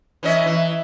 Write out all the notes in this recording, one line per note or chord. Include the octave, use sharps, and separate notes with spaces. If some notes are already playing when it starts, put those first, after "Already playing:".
E3 C#4 D#5
E3